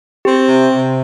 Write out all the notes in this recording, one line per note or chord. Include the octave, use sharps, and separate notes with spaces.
C4 G4
C3
C3